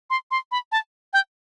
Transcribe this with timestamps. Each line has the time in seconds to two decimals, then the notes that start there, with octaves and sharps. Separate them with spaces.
0.10 C6
0.31 C6
0.51 B5
0.72 A5
1.13 G5